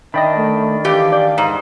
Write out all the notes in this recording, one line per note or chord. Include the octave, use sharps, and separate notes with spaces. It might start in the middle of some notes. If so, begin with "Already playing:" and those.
D#3 D4 D#5 E5 G5 B5
A3
E3 G4 F5
D5 G5
G#2